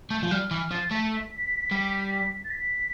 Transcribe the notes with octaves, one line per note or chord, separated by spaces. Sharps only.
A3 G6
F3
G3 F6
E3 F6
F3 A6
A3 B6
G3
A6
B6